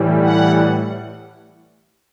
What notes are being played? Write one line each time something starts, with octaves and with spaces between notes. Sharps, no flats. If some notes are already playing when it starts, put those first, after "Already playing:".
Already playing: A2 E3 G3
F#5